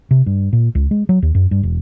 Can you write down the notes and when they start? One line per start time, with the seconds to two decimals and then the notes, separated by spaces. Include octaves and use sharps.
0.11 C3
0.26 G2
0.53 A#2
0.75 C#2
0.91 G#3
1.09 F#3
1.22 D#2
1.35 F#2
1.51 G2
1.63 E1